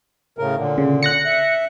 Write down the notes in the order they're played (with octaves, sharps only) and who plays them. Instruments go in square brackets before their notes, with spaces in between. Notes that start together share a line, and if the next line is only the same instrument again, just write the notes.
[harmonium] A2 C#3 A#4
A#2 D3
[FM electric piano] C#3
F#6 A#6 C#7
[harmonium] E5